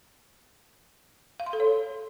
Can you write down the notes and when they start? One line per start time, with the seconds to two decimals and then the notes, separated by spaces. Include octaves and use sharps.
1.40 F5
1.46 C6
1.53 A4
1.60 C#5